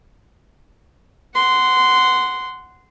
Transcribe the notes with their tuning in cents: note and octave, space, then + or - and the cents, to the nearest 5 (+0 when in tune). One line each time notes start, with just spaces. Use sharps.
F#5 +0 C6 -15